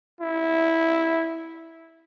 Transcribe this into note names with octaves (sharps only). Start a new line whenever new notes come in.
E4